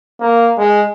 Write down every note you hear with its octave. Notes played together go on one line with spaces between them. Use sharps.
A#3
G#3